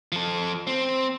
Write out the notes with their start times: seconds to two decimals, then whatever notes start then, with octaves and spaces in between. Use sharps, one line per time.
0.12 F3 A4
0.67 C4